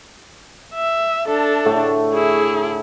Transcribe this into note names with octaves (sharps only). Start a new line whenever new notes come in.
E5
D4 A4 E5
A2 D3 A3
E4 G#4